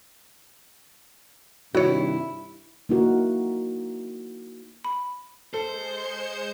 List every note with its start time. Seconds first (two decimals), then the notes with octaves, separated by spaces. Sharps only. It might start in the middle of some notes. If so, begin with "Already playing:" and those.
1.75 G2 C3 D#3 E4 F#4 C#5
2.89 A#3 D#4 E4 F#4 A#4
4.85 B5
5.54 G#3 A4 C5 G6 C#7